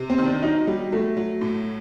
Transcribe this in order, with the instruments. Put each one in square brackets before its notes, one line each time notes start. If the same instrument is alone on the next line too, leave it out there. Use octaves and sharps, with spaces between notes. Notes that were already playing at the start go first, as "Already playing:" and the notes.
Already playing: [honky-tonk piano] C3
[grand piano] C4
[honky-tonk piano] D#3
[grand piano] D4
[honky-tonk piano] F#3 [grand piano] D#4
[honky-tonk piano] F#3 [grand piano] G3
[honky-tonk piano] F#3 [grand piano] A3
[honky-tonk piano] F#3
A2